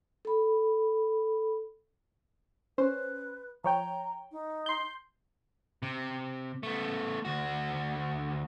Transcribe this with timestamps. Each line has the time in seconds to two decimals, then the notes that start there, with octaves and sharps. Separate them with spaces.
0.25 A4 B5
2.78 C#4 B4 C5
3.64 F3 C#5 G5 A#5
4.32 D#4
4.66 C6 G6
5.82 C3
6.63 A3 B3
7.25 D2 F#4